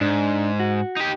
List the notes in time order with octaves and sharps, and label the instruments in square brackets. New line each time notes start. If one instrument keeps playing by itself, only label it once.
[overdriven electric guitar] G#2 [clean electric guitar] D4
[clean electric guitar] F#4
[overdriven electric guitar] D#4 G4